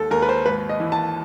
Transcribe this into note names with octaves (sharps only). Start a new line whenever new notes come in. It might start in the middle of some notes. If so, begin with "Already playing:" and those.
Already playing: D#2 A4
D#2 A#4
B4
C5
G#1 B4
D#5
E3
A5